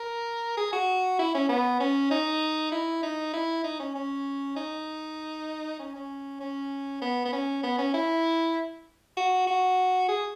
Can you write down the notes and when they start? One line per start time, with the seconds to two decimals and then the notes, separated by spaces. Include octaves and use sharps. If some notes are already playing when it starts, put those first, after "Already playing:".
Already playing: A#4
0.57 G#4
0.73 F#4
1.19 E4
1.35 C#4
1.49 B3
1.80 C#4
2.11 D#4
2.72 E4
3.03 D#4
3.34 E4
3.64 D#4
3.80 C#4
3.95 C#4
4.56 D#4
5.79 C#4
5.95 C#4
6.40 C#4
7.02 B3
7.26 B3
7.33 C#4
7.63 B3
7.78 C#4
7.94 E4
9.17 F#4
9.47 F#4
10.09 G#4